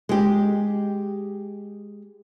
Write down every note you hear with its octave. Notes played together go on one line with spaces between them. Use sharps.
G#3 G4